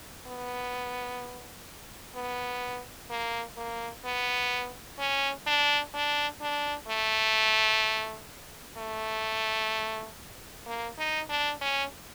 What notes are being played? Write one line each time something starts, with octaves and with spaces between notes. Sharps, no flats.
B3
B3
A#3
A#3
B3
C#4
D4
D4
D4
A3
A3
A#3
D#4
D4
C#4